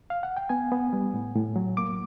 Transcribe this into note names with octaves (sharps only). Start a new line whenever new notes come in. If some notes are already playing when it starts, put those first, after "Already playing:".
F5
F#5
G5
B3 G#5
B3
G3
A2
A2
F#3
A#3 D6